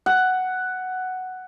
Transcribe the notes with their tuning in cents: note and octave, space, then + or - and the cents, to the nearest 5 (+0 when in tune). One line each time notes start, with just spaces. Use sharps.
F#5 +5